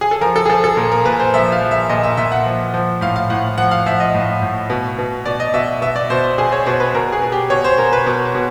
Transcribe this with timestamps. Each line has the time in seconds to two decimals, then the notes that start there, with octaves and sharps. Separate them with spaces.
0.01 G#4
0.11 A4
0.21 F3 A#4
0.36 A4
0.46 G#4
0.50 F3 A4
0.64 A4
0.77 A#2 A#4
0.92 A#4
1.05 A#2 B4
1.20 C5
1.34 F3 E5
1.52 F5
1.61 F3
1.71 E5
1.89 A#2 D#5
2.03 E5
2.17 A#2 E5
2.32 F#5
2.46 F3
2.74 F3
3.01 A2 F5
3.16 F5
3.30 A2 F#5
3.58 F3 F#5
3.71 F5
3.86 F3 E5
4.00 D#5
4.14 A2
4.42 A2
4.70 B2
4.99 B2
5.25 B2 D5
5.40 D#5
5.54 B2 E5
5.81 B2 E5
5.96 D5
6.10 B2 C5
6.24 C5
6.38 B2 G#4
6.52 C#5
6.66 B2 C5
6.80 B4
6.94 B2 A#4
7.12 G#4
7.22 B2
7.32 G4
7.50 B2 C#5
7.64 C5
7.78 B2 A#4
7.93 B4
8.06 B2
8.35 B2